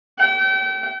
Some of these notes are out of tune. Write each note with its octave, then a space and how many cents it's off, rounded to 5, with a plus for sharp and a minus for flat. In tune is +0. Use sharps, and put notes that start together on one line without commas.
G5 -35